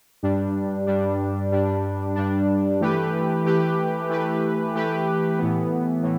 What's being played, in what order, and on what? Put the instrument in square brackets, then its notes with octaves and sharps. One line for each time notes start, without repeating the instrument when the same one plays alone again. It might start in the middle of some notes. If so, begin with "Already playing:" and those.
[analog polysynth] G2 G3 D4
G2 G3 D4
G2 G3 D4
G2 G3 D4
E3 A3 G4 B4
E3 A3 G4 B4
E3 A3 G4 B4
E3 A3 G4 B4
A2 E3 B3
A2 E3